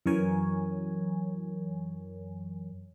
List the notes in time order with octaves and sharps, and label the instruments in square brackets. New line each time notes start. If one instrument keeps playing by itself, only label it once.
[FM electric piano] F#2 E3 F#3 A#4 C#5 G#5